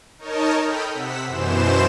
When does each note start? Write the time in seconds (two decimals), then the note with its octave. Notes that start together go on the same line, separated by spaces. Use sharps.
0.18 D#4 A#4 C#5 D#5 A5
0.62 A4 G5 B5 D#6 F6 G6
0.94 C3 F#5 E6 B6
1.26 F#2 B2 E3 C5 E7